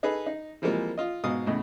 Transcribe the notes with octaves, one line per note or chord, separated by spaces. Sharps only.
D#4 G#4 A4 B4
D#4
E3 F3 G3 G#3 A#3 C4
F4 D#5
G#2 B2 F5 D#6
E2 A2 C#3 D#5